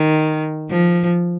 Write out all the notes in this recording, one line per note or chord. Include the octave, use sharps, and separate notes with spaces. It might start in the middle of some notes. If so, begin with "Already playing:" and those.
Already playing: D#3
F3